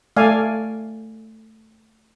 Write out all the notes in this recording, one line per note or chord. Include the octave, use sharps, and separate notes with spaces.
A3 D5 F5 G#5